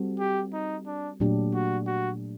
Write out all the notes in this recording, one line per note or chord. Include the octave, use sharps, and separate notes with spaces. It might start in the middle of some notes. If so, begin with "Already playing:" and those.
Already playing: G3 C4 F#4 A4
G4
D#4
D4
A#2 F#3 A3 D4 G4
F#4
F#4